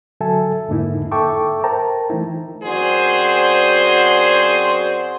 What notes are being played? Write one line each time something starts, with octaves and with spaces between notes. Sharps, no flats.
D3 F#3 A4 E5 G#5 A5
F2 G#2 D3 A#3 D#4 E4
A4 E5 G5 A5 C#6 D6
A#4 C5 G5 A5 A#5
E3 A3 D#4 E4
F#2 C4 F#4 G#4 C5 D5